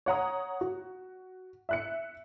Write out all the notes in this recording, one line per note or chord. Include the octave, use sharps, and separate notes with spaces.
C#5 F#5 A#5 D#6
F#4
E5 F#6 C#7